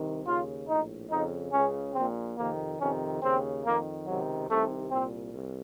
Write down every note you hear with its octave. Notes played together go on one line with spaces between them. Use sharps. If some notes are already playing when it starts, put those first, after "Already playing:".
Already playing: C2 C3 D#3
D#2 C#3 F4
A#1 A2 D#4
F2 C#3 D#4
C#2 C#4
C#3
A#1 A#2 C4
F2 C3 D#3 A#3
F2 C3 D#3 C#4
D#2 C#3 C4
F2 D#3 A#3
C#2 C3 D#3 F#3
C2 C3 D#3 A3
C2 A#2 C4
C2